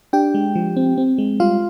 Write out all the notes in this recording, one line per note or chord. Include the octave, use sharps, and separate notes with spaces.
D4 G4 G5
G#3
F3
C4
C4
G#3
G3 F4 F5